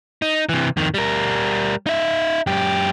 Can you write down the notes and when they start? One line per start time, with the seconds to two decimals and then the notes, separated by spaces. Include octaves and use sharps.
0.22 D#4
0.49 C3 E3
0.77 F2 D#3
0.94 G3 A#4
1.86 D#4 E5
2.47 F#2 G4